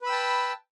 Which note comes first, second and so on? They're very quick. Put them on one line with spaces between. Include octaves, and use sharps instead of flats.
B4 B5 E6 G5 A5